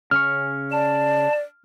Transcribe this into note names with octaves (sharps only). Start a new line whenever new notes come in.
C#3 C#4 C#6 F6
D5 A5